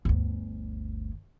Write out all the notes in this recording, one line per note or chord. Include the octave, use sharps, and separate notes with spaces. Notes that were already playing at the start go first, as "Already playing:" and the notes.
G1 D2